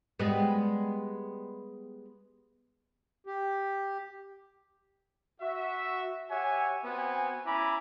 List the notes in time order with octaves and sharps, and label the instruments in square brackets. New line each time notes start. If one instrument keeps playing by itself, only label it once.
[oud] G3 G#3 B3
[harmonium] G4
[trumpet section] F#4 E5
G4 C#5 E5 F#5 G#5
B3 C4 F#4 G#5
C#4 E4 G#5 A#5 B5 D6